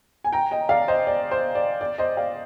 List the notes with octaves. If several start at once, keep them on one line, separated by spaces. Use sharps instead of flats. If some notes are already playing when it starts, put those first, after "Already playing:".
G#5
G5 A#5
D#5 G5
D5 F5
C5 D#5
D5
C5
D5
D5
C5 D#5
D5 F5